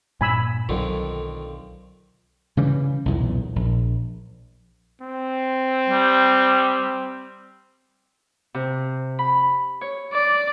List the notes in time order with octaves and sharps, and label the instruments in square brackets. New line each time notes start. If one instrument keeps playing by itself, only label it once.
[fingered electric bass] G2 A#2 [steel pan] G#5 B5 E6
[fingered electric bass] B1 F#3 [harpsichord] F2 D3 D#3
[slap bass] C#3 E3 G3
B1 E2 A#2
A#1
[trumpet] C4
[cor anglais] G3
[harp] C3
B5
C#5
[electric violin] D5